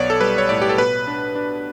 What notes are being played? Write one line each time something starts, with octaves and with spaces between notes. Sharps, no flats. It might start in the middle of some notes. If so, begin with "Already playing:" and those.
Already playing: B1 B3 C#5 D5
A4
G3 B4
C#5
A2 D5
G4
A4
B2 B4
D4
D4